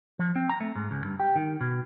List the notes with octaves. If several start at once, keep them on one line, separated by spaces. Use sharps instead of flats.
F3
C4
A#5
A3
G#2
C#2
G2
G4
D#3
B2